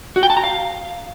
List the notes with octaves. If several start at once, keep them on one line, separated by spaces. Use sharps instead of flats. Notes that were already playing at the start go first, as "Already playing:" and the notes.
F#4
G5
A5
A#5
F5